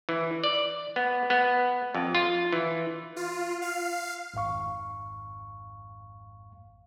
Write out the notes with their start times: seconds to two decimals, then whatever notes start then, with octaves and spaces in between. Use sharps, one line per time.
0.09 E3
0.44 D5
0.96 B3
1.30 B3
1.95 F2
2.15 F4
2.53 E3
3.16 F4
3.62 F5
4.34 G#1 F2 G#2 F5 C#6